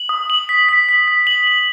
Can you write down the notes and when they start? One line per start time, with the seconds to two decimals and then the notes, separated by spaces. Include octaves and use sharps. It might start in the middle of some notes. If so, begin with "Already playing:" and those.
Already playing: F#7
0.09 D#6
0.30 F#7
0.49 B6
0.69 B6
0.89 B6
1.08 B6
1.27 F#7
1.47 F#7